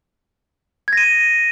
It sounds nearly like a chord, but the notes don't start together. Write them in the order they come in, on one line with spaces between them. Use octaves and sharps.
G#6 A#6 D#7